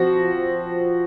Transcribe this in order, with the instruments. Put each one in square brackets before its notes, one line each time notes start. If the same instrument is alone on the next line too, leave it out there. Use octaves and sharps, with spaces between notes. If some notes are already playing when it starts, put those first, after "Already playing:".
Already playing: [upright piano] F3 C4 F#4